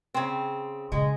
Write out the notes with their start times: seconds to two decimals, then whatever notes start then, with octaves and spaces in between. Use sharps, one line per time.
0.14 C#3 C4
0.92 A#2 C#3 G#3